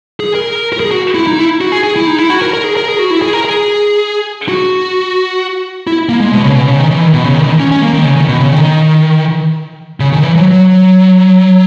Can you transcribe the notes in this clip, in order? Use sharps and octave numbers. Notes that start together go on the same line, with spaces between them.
G#4
A#4
A#4
G#4
F#4
E4
D#4
E4
F#4
G#4
G#4
E4
D#4
E4
F#4
A#4
A#4
G#4
A#4
G#4
F#4
E4
G#4
A#4
G#4
F#4
E4
A#3
G#3
B2
C#3
B2
C#3
D#3
E3
D#3
B2
C#3
D#3
E3
D#3
C#4
C#4
A#3
D#3
C#3
D#3
B2
C#3
D#3
C#3
D#3
E3
F#3
F#3